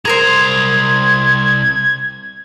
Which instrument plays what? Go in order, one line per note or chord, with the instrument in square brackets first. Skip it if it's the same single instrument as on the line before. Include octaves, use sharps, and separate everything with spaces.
[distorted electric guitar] C2 A#5 [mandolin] G#4 A#4 C5 [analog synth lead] G#6